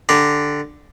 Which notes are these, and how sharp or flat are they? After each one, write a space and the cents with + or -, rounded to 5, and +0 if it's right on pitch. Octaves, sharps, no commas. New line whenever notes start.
D3 +0 G4 +0 A#5 +0